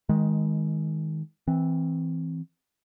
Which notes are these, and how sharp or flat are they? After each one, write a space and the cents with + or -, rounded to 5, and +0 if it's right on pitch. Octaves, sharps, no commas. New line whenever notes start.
D#3 +20 G#3 +0
E3 -10 C4 +0